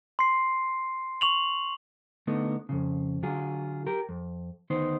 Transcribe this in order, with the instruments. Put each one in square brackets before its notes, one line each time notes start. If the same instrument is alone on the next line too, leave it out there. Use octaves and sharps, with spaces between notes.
[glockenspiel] C6 C7
C#6 F7 F#7
[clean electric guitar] D3 A3 B3 D#4
F2 A2 C#3
D3 F#3 F4 G#4
G4 A#4
F2
D2 D#3 B3 D#4 C5